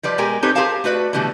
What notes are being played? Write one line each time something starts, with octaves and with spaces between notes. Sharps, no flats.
F3 G3 B4 D5
B2 G#3 G4 A#4 G#5
C4 D#4 G4 A4 B4 C#5
G4 G#4 A#4 C5 F5 A5
A3 F#4 B4 D5
B2 D3 E3 G3 A3